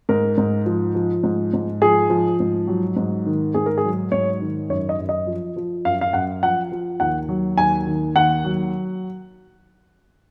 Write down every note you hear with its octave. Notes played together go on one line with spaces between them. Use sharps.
G#2 A#4
G#2
F3
F3
G#2
G#2
F3 G#4
F3
G#2
F#3
G#2
D#3
G#2 G#4
A#4
G#4
F#3
G#2 C#5
D#3
F#2 C#5
D#5
F#2
D#5
F3
F3
F#2 F5
F5
F#2 F#5
F3 F#5
F3
D#2 F#5
F#3
D#2 G#5
D#3
D#2 F#5
F#3